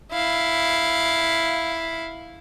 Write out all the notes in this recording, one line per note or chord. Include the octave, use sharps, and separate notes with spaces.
E4 F5